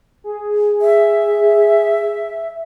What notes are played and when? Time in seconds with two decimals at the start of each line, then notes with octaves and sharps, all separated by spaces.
0.24 G#4
0.81 E5